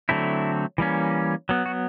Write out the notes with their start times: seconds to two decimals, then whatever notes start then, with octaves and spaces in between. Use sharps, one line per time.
0.09 D3 F#3 A3 C4 E4
0.78 E3 G3 A#3 C#4
1.49 F#3 B3
1.66 F#4